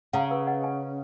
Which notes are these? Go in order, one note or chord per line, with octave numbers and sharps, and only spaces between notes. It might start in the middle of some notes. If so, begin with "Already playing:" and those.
C#3 F#5 A#5
B4
D#5 F#5
F5 G#5